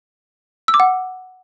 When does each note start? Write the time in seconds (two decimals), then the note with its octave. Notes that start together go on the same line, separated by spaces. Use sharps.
0.68 E6
0.74 D6
0.80 F#5